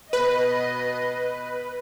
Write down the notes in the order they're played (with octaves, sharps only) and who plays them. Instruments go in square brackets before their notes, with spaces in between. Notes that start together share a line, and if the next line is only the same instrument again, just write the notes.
[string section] B2 D#5 [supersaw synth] B4